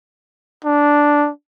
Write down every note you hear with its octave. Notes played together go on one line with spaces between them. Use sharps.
D4